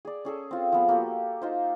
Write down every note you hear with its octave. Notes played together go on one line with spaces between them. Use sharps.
G#4 D5
C#4 G#4 A4
C4 F4
F3 B3
A#3 F#4 G4 A4
D#4 F4 C5